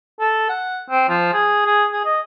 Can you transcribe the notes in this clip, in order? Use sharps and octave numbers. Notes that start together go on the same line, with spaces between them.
A4
F#5
C4
F3
G#4
G#4
G#4
D#5